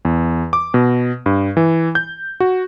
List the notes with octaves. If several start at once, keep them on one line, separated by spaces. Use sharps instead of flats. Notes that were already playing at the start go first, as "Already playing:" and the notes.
E2
D6
B2
G2
E3
G6
F#4